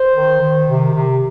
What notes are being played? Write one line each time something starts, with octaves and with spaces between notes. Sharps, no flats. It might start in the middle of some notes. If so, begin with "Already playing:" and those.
Already playing: C5
D#3
D#3
C3
C3